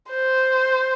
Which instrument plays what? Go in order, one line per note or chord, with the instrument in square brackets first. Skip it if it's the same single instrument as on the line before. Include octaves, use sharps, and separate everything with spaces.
[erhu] C5